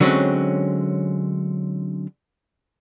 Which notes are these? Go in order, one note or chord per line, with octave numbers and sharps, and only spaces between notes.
D3 F#3 G#3 C4 C#4